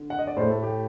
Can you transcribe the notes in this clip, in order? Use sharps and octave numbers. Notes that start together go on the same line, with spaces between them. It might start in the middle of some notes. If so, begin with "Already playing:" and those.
Already playing: D3
F#5
D#5
D5
A2 A3 C5
A4
G4